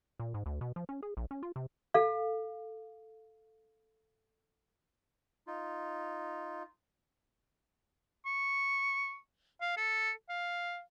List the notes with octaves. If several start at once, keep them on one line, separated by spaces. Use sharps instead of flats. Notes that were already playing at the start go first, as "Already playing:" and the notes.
A#2
G#2
D2
B2
F3
C#4
G#4
A#1
C#4
F4
C3
A4 F5
D#4 F4
C#6
F5
A4
F5